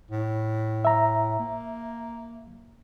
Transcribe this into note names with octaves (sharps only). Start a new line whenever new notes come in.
A2
E5 A#5
A#3